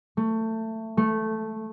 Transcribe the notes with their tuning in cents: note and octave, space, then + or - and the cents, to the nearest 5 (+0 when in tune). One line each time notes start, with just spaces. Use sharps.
A3 +20
A3 -5